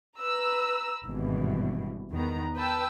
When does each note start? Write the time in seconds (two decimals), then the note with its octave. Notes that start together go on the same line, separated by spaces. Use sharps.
0.19 B4 A#5 E6
1.04 G#1 G2 B2 E3
2.11 E2 D#3 B3 A#5
2.56 B4 G5 A5 E6